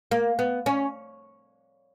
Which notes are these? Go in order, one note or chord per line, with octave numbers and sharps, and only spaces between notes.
A#3
B3
C#4